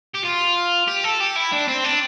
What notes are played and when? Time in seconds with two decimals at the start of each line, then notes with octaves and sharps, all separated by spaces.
0.14 G4
0.24 F4
0.87 G4
1.04 A4
1.20 G4
1.36 E4
1.52 D4
1.68 C4
1.84 D4